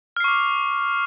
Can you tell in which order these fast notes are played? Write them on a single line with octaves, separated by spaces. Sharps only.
F6 C7 C#6 D6